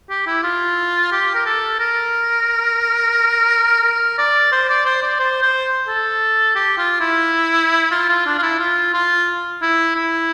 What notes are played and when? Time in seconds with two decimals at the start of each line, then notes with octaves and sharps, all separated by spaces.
0.10 G4
0.27 E4
0.43 F4
1.12 G4
1.35 A#4
1.46 A4
1.79 A#4
3.83 A#4
4.18 D5
4.52 C5
4.69 D5
4.85 C5
5.02 D5
5.20 C5
5.42 C5
5.88 A4
6.55 G4
6.78 F4
7.00 E4
7.91 F4
8.09 F4
8.26 D4
8.38 F4
8.42 E4
8.59 F4
8.94 F4
9.62 E4
9.96 E4